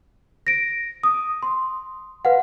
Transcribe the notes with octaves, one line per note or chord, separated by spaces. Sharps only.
A#6 D7
D#6
C6
B4 F5 F#5